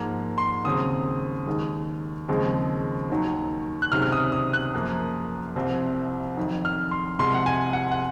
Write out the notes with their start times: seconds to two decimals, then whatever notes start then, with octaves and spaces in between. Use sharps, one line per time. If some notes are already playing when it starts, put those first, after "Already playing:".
Already playing: G#2 F3 A#3
0.38 C6
0.65 D#2 C#3 F#3 C4 D#6
1.46 D#2 D#3 G#3
2.28 D#2 C#3 F3 G#3 C4
3.10 D#2 D#3 F#3
3.82 F#6
3.92 C#2 C3 D#3 F#3 C4 F6
4.02 F6
4.12 D#6
4.32 D#6
4.53 F#6
4.73 F#2 F3 A#3
5.56 C2 C3 F3 C4
6.37 F2 D#3 F#3
6.65 F6
6.91 C6
7.19 C2 C3 F3 G#3 C6
7.34 F#5
7.46 G#5
7.73 F#5
7.91 F#5